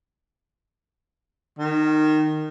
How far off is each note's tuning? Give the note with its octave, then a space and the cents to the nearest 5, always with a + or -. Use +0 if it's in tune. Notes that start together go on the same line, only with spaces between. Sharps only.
D#3 -15